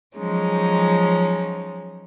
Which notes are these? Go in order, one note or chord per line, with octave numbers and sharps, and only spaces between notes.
F3 F#3 G#3 C#4 D#4